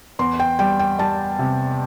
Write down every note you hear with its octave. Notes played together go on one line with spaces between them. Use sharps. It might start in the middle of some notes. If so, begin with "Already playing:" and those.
E2 C6
G5
G3 G5
G5
G3 A5
C3